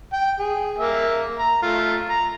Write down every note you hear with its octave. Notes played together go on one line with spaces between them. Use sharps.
G5
G#4
A#3 E5
A#5
A3 F4
A#5